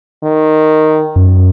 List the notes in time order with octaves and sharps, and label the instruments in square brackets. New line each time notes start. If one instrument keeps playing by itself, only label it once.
[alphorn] D#3
[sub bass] F#2